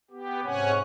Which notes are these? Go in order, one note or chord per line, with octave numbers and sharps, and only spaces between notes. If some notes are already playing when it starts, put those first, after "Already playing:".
B3 G4
G#2 C3 C#4 C#5 F#5 G#5